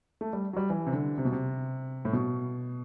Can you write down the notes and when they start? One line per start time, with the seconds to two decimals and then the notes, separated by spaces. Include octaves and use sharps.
0.21 A3
0.33 G3
0.53 F#3
0.57 G3
0.70 E3
0.87 C3
0.93 D3
1.18 C3
1.25 B2
1.32 C3
2.05 A2
2.13 B2